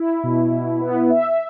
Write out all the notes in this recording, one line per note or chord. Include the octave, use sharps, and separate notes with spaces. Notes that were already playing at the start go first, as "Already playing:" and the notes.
Already playing: E4
B2
B2
B3
E5